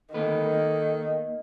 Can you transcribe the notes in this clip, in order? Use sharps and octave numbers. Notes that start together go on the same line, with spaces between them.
D2 D#3 A#3 A4 B4
A#3